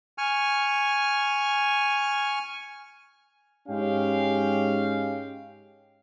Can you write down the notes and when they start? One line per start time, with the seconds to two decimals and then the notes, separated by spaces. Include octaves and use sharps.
0.18 G#5 C#6 F6
3.68 G#2 G#3 C#4 G4 F5 G5